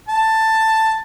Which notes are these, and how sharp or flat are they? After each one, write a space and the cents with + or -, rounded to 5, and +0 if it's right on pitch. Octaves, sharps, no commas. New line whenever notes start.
A5 +10